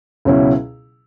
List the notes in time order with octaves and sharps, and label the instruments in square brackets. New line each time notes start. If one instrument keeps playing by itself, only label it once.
[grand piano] C#2 B2 F#3 C#4 E4